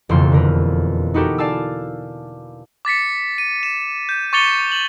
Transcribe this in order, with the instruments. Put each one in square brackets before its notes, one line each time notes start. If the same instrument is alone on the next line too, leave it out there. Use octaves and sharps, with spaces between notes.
[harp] E1 F2 C#3 A#3 C6 E6
D3 A#4 B4
D#4 E4 F#4 G4 A4 A#4
D5 F5 G#5 A5 E6
[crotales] D6 A6 B6 C#7
D#7
E7
G6
C#6 D6 A6 C#7 F7 G7
F#7